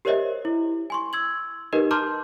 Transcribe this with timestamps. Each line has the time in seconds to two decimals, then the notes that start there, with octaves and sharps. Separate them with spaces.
0.05 G4 A#4 C5 C#5 D#5 E5
0.45 E4
0.90 G#5 C6 C#6
1.13 E6 G#6 F#7
1.73 D#4 G4 A#4 B4 D#5
1.91 A5 A#5 C6 D6 F6 G6